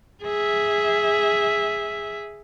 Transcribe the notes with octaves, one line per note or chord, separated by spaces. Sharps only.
G#4 E5